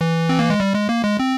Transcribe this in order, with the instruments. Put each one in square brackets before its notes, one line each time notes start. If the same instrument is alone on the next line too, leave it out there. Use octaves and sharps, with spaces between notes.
[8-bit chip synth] E3
C4
A#3
G#3
G3
G#3
A#3
G#3
C4